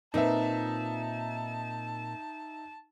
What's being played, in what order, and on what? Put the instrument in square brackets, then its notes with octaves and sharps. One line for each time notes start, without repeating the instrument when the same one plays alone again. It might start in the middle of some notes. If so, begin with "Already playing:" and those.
[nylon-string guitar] A#2 C4 B4 [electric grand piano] D#4 E5 [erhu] A5